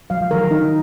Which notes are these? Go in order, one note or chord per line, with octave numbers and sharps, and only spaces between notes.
F#3 F5
F3
D#3 F#3 A#4
D#3 F#3 D#4